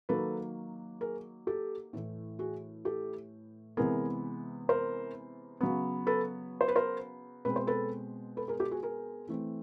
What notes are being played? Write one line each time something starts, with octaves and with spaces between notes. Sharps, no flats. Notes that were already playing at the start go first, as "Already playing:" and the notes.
D#3 F#3 A#3 A4 B4
G#4 A#4
G4 A4
A2 E3 A3
F#4 G#4
G4 A4
C3 E3 G#3 B3 G#4 A#4
A#4 C5
C#3 F#3 B3
A4 B4
C5
B4
A#4 C5
B2 G#3 C4 B4
C5
A4 B4
A4 B4
G#4 A#4
G4 A4
F#4 G#4
G#4 A#4
E3 A3 C4